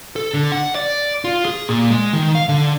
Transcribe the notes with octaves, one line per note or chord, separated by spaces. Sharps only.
A4
D3
F#5
D5
F4
G#4
A#2
G#3
D#3
F5
D3